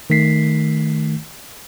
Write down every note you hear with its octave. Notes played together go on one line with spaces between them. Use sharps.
D#3 A3 B6 C7